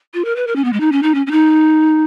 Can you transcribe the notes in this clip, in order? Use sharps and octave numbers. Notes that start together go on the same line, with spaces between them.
F4
A#4
B4
A#4
C#4
B3
G#3
D#4
C#4
D#4
C#4
C#4
D#4